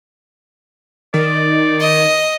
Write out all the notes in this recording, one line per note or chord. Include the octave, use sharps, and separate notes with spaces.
D#3 D5
D#5